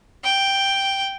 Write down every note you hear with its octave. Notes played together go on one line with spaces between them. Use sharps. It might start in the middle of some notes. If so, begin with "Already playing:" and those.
G5